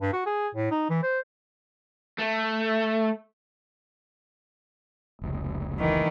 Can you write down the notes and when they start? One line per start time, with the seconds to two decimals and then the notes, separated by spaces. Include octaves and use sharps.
0.01 G2
0.13 F#4
0.26 G#4
0.55 A2
0.71 D#4
0.90 E3
1.03 C5
2.18 A3
5.21 F1 C#2
5.79 D#3 E3